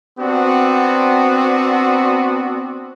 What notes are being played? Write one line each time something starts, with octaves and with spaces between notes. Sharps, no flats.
B3 C4 D4 F#4